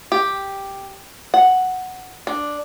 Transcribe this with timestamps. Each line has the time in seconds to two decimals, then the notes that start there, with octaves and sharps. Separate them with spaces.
0.12 G4
1.34 F#5
2.27 D4